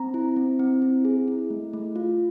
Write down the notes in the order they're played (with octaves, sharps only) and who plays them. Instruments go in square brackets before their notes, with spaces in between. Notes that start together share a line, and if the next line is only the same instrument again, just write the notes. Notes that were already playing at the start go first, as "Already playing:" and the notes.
Already playing: [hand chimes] C4 A#5
E4
C4
C4
E4
G#4
E4
A3
A3
F4